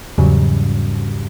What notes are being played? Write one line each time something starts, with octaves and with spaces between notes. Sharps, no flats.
E2 G#2 C#3 F#3 G3